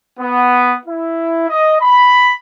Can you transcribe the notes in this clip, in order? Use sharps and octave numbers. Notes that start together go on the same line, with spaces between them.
B3
E4
D#5
B5